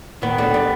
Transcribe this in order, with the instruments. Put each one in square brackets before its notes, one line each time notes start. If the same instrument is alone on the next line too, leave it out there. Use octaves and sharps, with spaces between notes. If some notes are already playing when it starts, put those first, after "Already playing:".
[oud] D#2 D#3 [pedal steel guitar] B3
[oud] D2 D3
G3